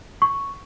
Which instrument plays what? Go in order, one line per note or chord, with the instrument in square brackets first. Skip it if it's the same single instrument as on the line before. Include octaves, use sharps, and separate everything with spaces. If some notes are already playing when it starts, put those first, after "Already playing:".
[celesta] C#6